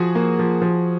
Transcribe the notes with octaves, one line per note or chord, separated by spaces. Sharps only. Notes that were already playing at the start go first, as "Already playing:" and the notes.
Already playing: F3 F#4 G#4
A#3
F3
F3